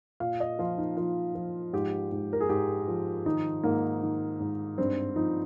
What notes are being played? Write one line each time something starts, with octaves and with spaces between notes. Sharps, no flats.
A#2 F5
D#5
F3 F4
D#4
F3 F4
F3
G#2 G4
G#2
A#4
G#4
G#2 G4
F3
D#3 D#4
G#2 A#3
D#3
G#2
G2 C4
F3 D#4